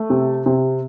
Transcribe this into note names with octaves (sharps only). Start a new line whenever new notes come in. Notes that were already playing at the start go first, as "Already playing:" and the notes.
Already playing: A3
C3
C3